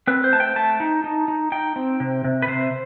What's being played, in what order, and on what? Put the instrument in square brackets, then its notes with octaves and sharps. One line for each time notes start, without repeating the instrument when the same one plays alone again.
[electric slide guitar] C4 B4
C5
A3 A5
G5
A3 A5
D#4
D#4
D#4
D#4 G5
C4
C3
C3
B4
C3 C5